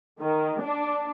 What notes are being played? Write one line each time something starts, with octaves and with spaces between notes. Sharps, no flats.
D#3
D4